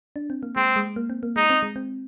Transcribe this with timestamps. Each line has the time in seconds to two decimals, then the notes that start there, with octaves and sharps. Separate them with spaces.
0.16 D4
0.30 C4
0.43 A#3
0.56 G#3 C4
0.76 G#3
0.96 A#3
1.10 C4
1.23 A#3
1.36 G#3 D#4
1.50 C4
1.63 G#3
1.76 C4